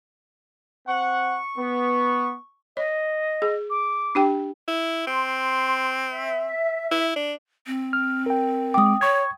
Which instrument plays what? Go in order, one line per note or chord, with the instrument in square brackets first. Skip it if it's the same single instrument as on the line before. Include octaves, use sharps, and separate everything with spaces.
[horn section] C4 F#5 [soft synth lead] C#6
[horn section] B3
[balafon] C#5 [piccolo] D#5
[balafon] G#4
[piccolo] D6
[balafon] D4 G4 G5
[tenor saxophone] E4
[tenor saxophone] C4 [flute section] C6
[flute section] E5
[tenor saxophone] E4
D4
[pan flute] C4
[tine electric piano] F6
A#4 G5
[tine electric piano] G#3 D6 [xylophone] G5 D#6
[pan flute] C#5 [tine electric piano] C#6 G#6